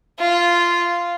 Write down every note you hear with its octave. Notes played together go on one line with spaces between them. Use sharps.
F4